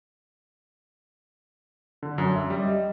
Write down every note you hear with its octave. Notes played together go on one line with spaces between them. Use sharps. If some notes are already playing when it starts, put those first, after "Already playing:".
D3
F#2
E5
G3
D#5